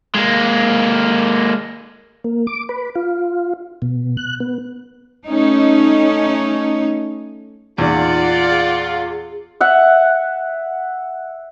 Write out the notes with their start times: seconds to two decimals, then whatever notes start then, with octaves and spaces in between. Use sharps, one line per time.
0.15 G#3 A#3
2.24 A#3
2.47 D6
2.69 B4
2.95 F4
3.82 B2
4.17 F#6
4.40 B3
5.27 A3 C#4 D#4
7.78 E2 A#2 D#4 F4 D5 F#5
8.48 G#4
9.61 E5 F#5